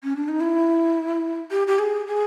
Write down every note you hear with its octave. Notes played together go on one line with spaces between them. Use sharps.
C#4
D4
D#4
E4
G4
G4
G#4
G#4